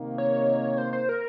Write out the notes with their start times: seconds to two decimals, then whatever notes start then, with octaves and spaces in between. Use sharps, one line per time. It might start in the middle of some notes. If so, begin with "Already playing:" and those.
Already playing: C3 D#3 A#3 D#4
0.18 C#5
0.78 C5
0.93 C5
1.09 A#4